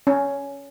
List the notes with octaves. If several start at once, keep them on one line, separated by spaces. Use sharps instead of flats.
C#4